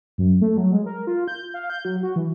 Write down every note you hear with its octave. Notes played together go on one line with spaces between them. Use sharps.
F#2
A3
F#3
G#3
A#4
F4
G6
F5
G6
F#3
F#4
E3